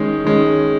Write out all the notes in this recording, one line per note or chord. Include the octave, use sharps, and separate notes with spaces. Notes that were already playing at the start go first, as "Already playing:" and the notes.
Already playing: D#3 G#3 C#4
D#3 G#3 C#4